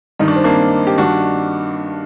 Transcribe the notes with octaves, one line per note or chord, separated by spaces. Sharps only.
G2 D#3 D#4
D4
C4
A#3 D4
G4
G2 D#3 D4 F#4